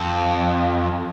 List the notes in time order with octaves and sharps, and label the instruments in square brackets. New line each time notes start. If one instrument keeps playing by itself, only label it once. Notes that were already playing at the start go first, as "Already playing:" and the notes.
Already playing: [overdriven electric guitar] F2